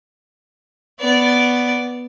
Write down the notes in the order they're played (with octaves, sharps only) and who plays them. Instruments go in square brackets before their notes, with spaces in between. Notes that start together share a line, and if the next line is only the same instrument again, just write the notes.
[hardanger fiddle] B3 D5